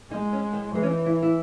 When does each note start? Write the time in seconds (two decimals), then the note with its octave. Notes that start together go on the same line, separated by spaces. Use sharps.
0.11 G#3 D#4
0.33 C#4
0.53 D#3
0.75 E3 G#3
0.83 C#4
0.91 D#4
1.06 E4
1.23 E4